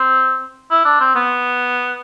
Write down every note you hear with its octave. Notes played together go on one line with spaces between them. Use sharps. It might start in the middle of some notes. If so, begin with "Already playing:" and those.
Already playing: C4
E4
D4
C4
B3